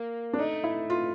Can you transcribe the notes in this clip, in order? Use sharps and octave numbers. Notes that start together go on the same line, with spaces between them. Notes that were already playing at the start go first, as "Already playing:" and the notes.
Already playing: A#3
D4
A3 D#4
E4
F4